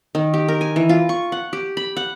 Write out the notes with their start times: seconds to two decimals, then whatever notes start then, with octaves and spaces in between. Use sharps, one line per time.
0.15 D#3
0.34 G4
0.48 A#4
0.61 G#5
0.76 E3
0.89 F4
1.09 C#6
1.32 F#5
1.53 G4
1.77 B5
1.97 F#5